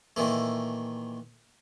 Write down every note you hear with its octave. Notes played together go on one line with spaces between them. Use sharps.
A#2 D#3 E3 A3